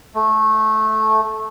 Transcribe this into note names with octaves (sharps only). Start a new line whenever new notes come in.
A3